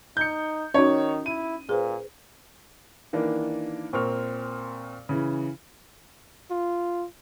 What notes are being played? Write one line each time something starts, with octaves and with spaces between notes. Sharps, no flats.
D#4 G6 C#7
D#3 C#4 D#4 F#4 C#5
E4 D#7
A#2 G#4 B4 C5
D#3 E3 A#3 D4
A#2 C4 A#4 C6 C#6 F6
C#3 E3
F4